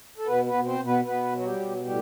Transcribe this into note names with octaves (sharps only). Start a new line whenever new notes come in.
A4
B2 B3 B4
B3 B4
B2
C4 C5
B2
B3 B4
B2 B3 B4
F#3 F#4
G3 G4
B2
A2 G3 G4